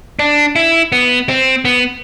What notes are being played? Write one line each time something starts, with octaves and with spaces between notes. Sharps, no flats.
D4
E4
B3
C4
B3